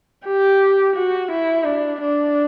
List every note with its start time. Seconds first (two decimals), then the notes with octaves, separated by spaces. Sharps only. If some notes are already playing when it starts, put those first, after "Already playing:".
0.26 G4
0.96 F#4
1.31 E4
1.65 D4
2.01 D4